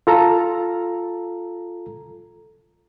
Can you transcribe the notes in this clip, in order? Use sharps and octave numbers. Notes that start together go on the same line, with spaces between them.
F4 A4 A#5